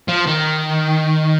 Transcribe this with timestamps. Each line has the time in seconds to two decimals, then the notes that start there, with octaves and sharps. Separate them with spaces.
0.08 F3
0.27 D#3